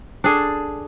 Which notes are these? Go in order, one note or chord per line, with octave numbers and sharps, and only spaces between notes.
D4 G#4 A4